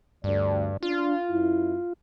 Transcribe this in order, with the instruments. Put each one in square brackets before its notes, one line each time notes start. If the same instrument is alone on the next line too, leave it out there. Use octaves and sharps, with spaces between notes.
[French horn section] D2 D5 [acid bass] G2
[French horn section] D4 [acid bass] F4
[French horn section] F#2 E4